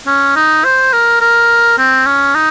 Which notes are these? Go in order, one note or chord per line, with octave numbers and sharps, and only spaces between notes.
C#4
D#4
C5
A#4
A#4
C4
C#4
D#4